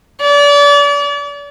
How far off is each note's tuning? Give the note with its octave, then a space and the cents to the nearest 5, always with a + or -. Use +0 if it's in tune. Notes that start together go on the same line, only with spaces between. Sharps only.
D5 -35